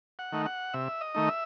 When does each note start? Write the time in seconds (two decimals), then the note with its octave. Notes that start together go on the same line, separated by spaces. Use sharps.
0.19 F#5
0.32 D#3 A3 D#4
0.46 F#5
0.73 C3 E5
1.01 D#5
1.15 D#3 A3 D#4
1.28 E5